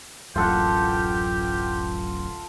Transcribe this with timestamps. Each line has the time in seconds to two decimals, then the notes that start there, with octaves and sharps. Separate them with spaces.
0.36 D1 A1 F#2 F4 G4 A4 F#5